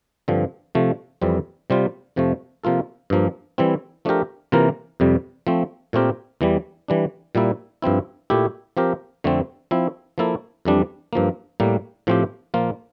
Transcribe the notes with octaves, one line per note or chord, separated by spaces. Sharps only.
G2 D3 F3 C4
C3 F3 A3
F2 E3 G3 C4
C3 G3 C4 F4
F2 C3 F3 A3
C3 F3 A#3 F4 A4
G2 F3 A#3
E3 G3 C4 E4
F3 A3 D4 G4 A#4
C3 E3 A#3 F4 A#4
F2 C3 G3
F3 A3 C4
A#2 A3 C4 G4 A#4
E2 E3 G3
E3 G3 D4
A#2 G3 A#3 E4
G2 F3 C4 E4
A#2 A3 E4 G4
F3 C4 G4 A#4
F2 D3 A3 C4
F3 C4 E4
F3 A#3 E4 A4
F2 E3 G3 D4
G2 F3 A#3
A2 G3 A#3
A2 F3 C4 G4
A#2 F3 A#3 F4